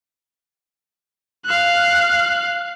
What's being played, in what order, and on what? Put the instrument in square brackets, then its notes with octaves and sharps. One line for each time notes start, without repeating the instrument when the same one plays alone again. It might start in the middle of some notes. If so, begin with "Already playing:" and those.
[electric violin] F5 F#6